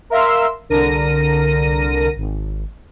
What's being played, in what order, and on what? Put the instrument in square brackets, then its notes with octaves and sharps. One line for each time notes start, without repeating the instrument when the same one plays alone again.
[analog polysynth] A#4 E5 F5 C6 E6
C2 D3 A#4 A#6 D#7
G#1